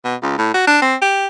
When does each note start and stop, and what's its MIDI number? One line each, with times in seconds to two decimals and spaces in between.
0.04 0.15 47
0.22 0.37 37
0.38 0.50 45
0.54 0.63 66
0.67 0.80 62
0.82 0.96 60
1.02 1.27 67